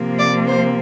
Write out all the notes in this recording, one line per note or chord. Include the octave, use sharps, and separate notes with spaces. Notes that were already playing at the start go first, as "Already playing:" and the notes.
Already playing: C3 F3 A#3
D5
C5